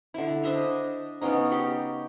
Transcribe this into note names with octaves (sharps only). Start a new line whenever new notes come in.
D3 E4
D4 C5 D#5 E5
C#3 B3 C#4 D#4
G4 G5 C#6